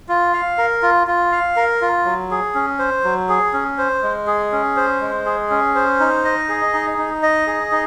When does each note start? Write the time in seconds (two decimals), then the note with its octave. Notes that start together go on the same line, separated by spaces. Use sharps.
0.09 F4
0.33 F5
0.58 A#4
0.82 F4
1.07 F4
1.32 F5
1.56 A#4
1.82 F4
2.05 F#3
2.31 G#4
2.55 C#4
2.79 C5
3.04 F#3
3.29 G#4
3.53 C#4
3.78 C5
4.03 G#3
4.27 G#4
4.52 C#4
4.76 C5
5.01 G#3
5.26 G#4
5.50 C#4
5.75 C5
6.00 D#4
6.25 D#5
6.49 G#4
6.73 D#4
6.98 D#4
7.23 D#5
7.47 G#4
7.72 D#4